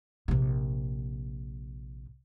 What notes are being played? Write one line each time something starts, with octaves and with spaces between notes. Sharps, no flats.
A#1 C3